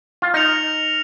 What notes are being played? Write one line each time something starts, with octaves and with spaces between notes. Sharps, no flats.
F4
D#4 F6 A#6 C#7 F7